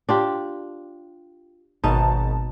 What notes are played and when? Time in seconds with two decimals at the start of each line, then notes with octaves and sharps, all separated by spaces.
0.09 D4 F4 G4
1.84 G#1 B2 D#4 A5